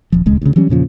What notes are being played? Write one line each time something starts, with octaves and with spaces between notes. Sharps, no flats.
D#1 F3
D#1 C#2 G#3
D2 C#3
E3 F#3 G3 C#4
E2 A#2 C#3 F3